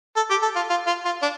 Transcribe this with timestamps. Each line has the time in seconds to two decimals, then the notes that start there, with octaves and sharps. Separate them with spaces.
0.16 A4
0.30 G4
0.42 A4
0.56 F4
0.70 F4
0.87 F4
1.05 F4
1.22 D4